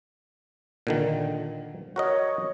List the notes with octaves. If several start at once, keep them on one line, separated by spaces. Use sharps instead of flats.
A#2 D3 D#3
F#4 A#4 C#5 D#5